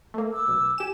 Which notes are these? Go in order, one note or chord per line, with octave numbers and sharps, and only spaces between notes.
A3 A#3
D6 E6
B1
G4 G#5 E7